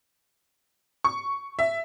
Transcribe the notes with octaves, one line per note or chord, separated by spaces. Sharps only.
C#6
E5